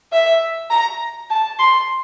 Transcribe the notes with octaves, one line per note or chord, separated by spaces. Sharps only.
E5
A#5
A5
C6